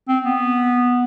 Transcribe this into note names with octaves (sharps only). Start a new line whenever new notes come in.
C4
B3